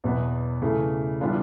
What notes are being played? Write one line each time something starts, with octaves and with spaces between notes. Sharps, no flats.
E2 B2 F#3 B3
C#3 E3 A3
E3 G3 B3 D4 F4